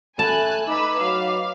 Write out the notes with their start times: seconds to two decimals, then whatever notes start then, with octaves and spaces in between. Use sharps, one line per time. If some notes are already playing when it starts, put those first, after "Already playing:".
0.19 A3 G#5 A5 B5 F#6
0.67 D#4 B4 B5 D6 E6
1.01 F#3 F5